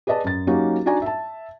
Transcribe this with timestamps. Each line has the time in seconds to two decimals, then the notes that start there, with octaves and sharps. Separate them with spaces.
0.07 G#4 B4 D5 D#5 A5
0.24 F#2 A6
0.47 F#3 A#3 C#4 D#4 F#4 G4
0.86 D4 D#4 F#4 D5 G#5 A#5
1.02 E5 A5